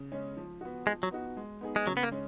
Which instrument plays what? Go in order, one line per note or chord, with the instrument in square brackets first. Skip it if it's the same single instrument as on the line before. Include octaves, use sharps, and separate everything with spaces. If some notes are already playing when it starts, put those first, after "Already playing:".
Already playing: [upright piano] C#3
G#3 C#4
F3
B3 F#4
[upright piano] F3 [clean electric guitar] G#3
[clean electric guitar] F#3
[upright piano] B3 D#4 F#4
G#3
B3 D#4 G#4
[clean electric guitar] G#3
[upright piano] C#3 [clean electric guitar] F#3
[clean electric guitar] B3
A#3
[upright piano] G#3 C#4